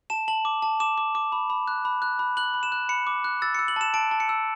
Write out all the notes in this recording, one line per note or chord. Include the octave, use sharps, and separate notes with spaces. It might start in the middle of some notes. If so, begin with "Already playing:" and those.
A5 E7
A5 F#7
D6
A5
D6 E7
D6
D6
B5
B5
F#6
B5
F#6
B5
F#6 F#7
B5
E7
F#6
B5 C#7
D6
F#6
E6 A6
E6 C#7
F#7
A5 E7
A5 D7
A5
C#7
E6